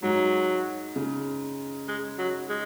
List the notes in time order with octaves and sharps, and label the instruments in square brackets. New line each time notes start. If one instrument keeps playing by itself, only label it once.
[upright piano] G#2 [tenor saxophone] F#3
[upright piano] C#3
[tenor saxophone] G#3
F#3
G#3